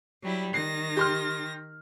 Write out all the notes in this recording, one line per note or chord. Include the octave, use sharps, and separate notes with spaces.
F#3 G3 E4
D#3 A#6 C7
G4 C6 F6